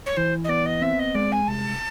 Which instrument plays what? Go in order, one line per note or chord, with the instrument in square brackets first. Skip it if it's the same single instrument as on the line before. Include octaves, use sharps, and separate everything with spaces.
[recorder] C#5
[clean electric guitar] E3 [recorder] C5
[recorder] D#5
[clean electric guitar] B3 [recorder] D5
[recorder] D#5
[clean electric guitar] C4 [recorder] E5
[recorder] D#5
[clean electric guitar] G#3 [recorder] D5
[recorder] G#5
[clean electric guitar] C2 [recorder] A5